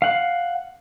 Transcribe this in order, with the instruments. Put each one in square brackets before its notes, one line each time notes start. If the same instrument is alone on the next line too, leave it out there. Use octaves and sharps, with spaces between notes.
[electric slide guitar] F5 F#5